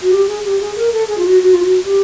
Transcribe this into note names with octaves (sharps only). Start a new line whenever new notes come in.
F#4
G4
G#4
G4
G#4
A#4
A4
G#4
F4
F#4
F#4
F4
F#4
G4